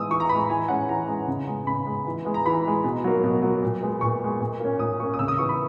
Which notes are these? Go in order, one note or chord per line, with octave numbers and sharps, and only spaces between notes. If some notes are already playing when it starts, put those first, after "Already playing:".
Already playing: E3 G#3 B3 D#6 E6
E3 C#6
A#5
B3 B5
G#3
E3 G#5
G#3 C#4 F#5
E3 A#5
G#3 C#4
C#3
G#3 B3
C#3 B5
G#3 B3
E3
G#3 B3
A#5
E3 B5
G#3 B3
B2
F#3 A#3
B2
F#3 A#3
A#2
G#3 B3
A#2 C#6
G#3 B3
A#2
A#3 C#4
A#2 D#6
A#3 C#4 C#6
D#6
C#3 E6
D#6
E3 B3 C#6
B5